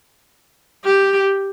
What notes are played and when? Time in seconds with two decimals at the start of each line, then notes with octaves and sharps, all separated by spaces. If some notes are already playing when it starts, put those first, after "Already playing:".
0.84 G4